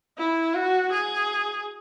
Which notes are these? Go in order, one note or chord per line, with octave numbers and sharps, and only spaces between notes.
E4
F#4
G#4